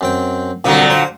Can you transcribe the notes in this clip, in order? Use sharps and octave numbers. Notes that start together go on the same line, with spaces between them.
F#2 C4 G5
C2 A#2 D3 F#3 F5
C5 A#5